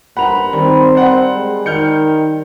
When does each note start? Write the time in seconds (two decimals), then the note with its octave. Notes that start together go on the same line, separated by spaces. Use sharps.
0.17 G2 A#4 C5 F#5 B5 F7
0.53 D#3 G3 C4
0.95 C5 D5 F#5
1.35 G#3
1.66 D#3 F6 G6 C#7